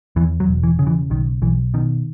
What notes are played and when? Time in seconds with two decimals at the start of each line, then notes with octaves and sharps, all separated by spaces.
0.16 E2 E3
0.40 F#3
0.48 E1
0.63 E3
0.79 C#3
0.87 E3
1.10 B1 D#3
1.42 B1 E3
1.74 B2 D#3